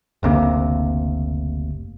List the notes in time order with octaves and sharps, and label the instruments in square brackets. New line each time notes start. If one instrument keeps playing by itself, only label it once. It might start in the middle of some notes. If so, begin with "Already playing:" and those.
[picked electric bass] F#1 D2 C3 A#3